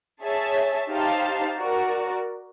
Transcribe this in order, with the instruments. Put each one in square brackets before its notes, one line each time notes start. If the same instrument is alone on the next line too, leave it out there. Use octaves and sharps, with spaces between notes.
[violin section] G#4 C#5 E5 A5
D#4 G4 C5 F5 A5
F#4 A#4 D5